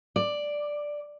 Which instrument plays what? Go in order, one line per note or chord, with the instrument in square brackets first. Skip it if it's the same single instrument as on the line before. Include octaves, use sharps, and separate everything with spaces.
[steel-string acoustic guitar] D5